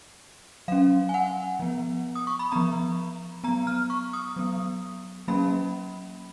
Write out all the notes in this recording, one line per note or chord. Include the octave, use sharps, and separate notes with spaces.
F#3 C#4 F5
G#5
F#5
F3 B3
D#6
C#6
B5
F3 B3 A#5
F#3 B3 A#5
F6
C#6
D#6
F#3 B3
F#3 A#3 C#4 B5